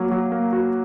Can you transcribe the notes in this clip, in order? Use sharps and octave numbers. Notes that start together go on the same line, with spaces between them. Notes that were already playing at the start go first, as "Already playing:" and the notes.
Already playing: F#3 A#3
F#3
A#3
F#4